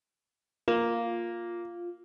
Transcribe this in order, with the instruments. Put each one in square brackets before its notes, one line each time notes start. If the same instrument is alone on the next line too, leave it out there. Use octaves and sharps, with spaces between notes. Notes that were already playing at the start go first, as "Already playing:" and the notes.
[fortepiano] A#3 [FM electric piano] F4